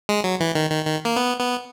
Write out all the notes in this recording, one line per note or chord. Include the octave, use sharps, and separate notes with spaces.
G#3
F#3
E3
D#3
D#3
D#3
A#3
B3
B3